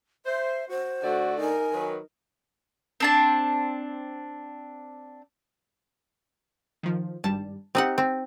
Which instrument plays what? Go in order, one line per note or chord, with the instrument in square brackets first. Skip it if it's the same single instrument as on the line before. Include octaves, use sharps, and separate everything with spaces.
[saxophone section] C5 [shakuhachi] E5
[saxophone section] F#4 [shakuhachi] C5
[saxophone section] D3 A3 D5 [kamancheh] F#4
[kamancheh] D#4 A#4 [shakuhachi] G#5
[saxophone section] D#3 F#3 B4
[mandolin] C4 D4 A5
[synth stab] D#3 F3
[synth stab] G#1 G2 G3 [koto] A5
[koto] C4 D#4 F#5 [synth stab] G4
[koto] C4